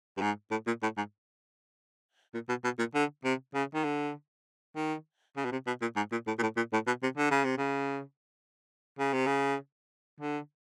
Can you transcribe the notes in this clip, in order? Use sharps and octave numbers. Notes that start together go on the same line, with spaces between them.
G2
G#2
A2
A#2
A2
G#2
A#2
B2
B2
A#2
D3
C3
C#3
D#3
D3
D#3
C#3
B2
C3
B2
A#2
G#2
A#2
A2
A#2
A2
A#2
A2
B2
C3
D3
C#3
C3
C#3
C#3
C3
C#3
D3